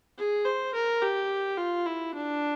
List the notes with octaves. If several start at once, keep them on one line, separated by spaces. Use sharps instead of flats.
G#4
C5
A#4
G4
F4
E4
D4